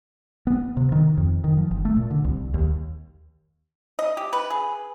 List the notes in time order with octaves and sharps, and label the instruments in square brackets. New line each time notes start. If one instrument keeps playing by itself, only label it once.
[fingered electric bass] B3
C3
D#3
F2
D#3
F3
G1
A3
A#2
D3
C2
D#2
[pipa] D#5
G4
B4
G#4